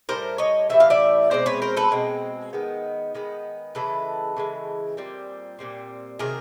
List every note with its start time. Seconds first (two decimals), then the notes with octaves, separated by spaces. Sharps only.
0.09 A2 E3 G3 A#4 C5
0.38 C#5 D#5
0.69 A2 E3 G3 E5
0.80 F5
0.90 D5 E5
1.30 B2 G#3 C4 C5 D5
1.46 B4 C#5
1.62 A#4 C5
1.77 A4 B4
1.91 B2 G#3 C4
2.53 D#3 G#3 B3
3.15 D#3 G#3 B3
3.75 C#3 E3 G#3 A4 B4
4.37 C#3 E3 G#3
4.97 A#2 G3 C4
5.59 A#2 G3 C4
6.19 C3 D#3 F#3 G#4 A#4